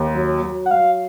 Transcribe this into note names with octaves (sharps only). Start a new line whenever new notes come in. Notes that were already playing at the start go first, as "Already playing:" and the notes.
Already playing: D#2
F#3
F#3
F#5
F#3 F5